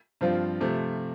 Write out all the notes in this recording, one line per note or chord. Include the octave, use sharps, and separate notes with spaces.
G2 F3 C4 F4
C3 F3 A3